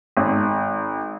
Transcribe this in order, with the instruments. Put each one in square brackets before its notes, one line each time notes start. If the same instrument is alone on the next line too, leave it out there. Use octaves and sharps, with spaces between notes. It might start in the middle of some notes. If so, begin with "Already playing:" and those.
[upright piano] G#1